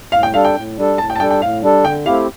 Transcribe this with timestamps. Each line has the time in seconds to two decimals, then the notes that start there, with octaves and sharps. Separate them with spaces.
0.12 A2 F5
0.23 G5
0.33 G3 D4 A4 F5
0.45 G5
0.55 A2
0.77 G3 D4 A4
0.98 A2 A5
1.10 G5
1.15 A5
1.20 G3 D4 A4 G5
1.31 G5
1.41 A2 F5
1.62 G3 D4 A4
1.84 D3 G5
2.06 A3 C4 E4 G4 F5